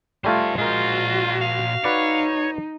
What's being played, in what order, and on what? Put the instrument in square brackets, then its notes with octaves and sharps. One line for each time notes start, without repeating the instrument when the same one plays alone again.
[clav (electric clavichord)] G3 A3 F4 [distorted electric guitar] C5 G#5
[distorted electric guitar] A#2 C5 [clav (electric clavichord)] G#3 A#4 [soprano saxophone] F4 [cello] F#4
[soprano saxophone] F5
[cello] D#4 [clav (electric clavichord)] F#4 B4 D5 [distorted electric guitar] C#5